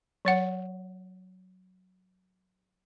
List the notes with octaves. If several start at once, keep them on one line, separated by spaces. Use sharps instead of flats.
F#3 C#5 F#5